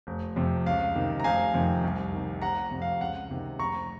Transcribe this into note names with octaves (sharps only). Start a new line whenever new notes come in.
F1
F2 C3
C#2 F5
C3 D#3
A#5
F1 F5 G#5
F2 C3 D#3
C2
C3 D#3
F1 F#5 A#5
F2 C3
F5
C#2 F#5
C3 D#3
F1 A#5 C#6